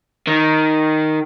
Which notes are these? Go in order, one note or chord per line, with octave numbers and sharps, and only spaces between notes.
D#3